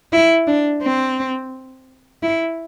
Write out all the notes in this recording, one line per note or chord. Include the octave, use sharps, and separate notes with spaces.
E4
D4
C4
E4